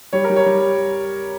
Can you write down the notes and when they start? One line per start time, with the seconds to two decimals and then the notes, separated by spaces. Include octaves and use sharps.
0.13 G3 C#5
0.24 A#4
0.30 G3
0.36 C#5
0.46 G3